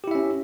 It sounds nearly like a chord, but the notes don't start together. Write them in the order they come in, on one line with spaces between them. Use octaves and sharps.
G4 E4 E5 C#4